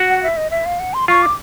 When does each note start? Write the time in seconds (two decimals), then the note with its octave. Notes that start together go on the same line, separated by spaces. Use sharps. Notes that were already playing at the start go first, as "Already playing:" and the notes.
Already playing: F#4
0.09 F#5
0.23 E5
0.37 D#5
0.51 E5
0.65 F5
0.80 F#5
0.94 C6
1.08 F4 C#6
1.22 D6